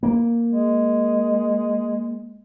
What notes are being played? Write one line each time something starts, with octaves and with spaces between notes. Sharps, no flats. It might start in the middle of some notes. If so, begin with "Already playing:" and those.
A#3
G#3